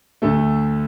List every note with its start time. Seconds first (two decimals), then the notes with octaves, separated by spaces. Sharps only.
0.22 D2 D3 A3 A4